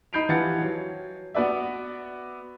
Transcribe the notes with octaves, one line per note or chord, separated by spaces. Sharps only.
D#4 B5 G6 C7 D7 F7
E3 F3 G4 F#5 A6 C#7
F#3
B3 F#4 B4 D5 E5